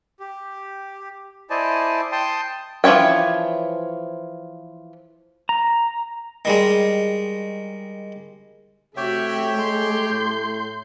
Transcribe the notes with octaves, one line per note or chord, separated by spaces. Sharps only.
G4
E4 C5 D5 D#5 G#5 A5
G5 A5 C6 D#6
E3 F3 E4 C#5 G5
A#5
D#3 G3 G#3
C3 A3 F#4 G4 C#5 E5 G5
G#3 C6 G6
A2